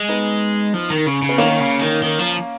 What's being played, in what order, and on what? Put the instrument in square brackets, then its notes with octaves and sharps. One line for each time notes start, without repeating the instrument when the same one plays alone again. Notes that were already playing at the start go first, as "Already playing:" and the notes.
Already playing: [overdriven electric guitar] G#3
[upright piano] B3 D#4
[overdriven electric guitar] F3
D#3
C#3
C#3
[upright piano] B3
[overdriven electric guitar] D#3 [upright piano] A#3 C#4
[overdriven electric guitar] C#3
D#3
D#3
F3